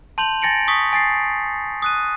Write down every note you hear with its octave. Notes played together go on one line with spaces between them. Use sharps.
A5 C6 G6 F7 F#7
G#5 A6 A#6 C#7 D7 F#7
C#6 D#6 B6
G#5 A6 C7
D#6 F#6 D#7